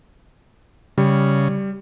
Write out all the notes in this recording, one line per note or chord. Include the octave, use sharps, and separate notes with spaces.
C#3 G3